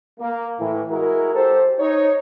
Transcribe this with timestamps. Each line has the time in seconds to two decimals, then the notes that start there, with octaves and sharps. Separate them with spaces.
0.20 A#3
0.60 A2 E3
0.90 G#3 E4 F#4 A#4
1.34 G4 A4 C5
1.79 D#4 C#5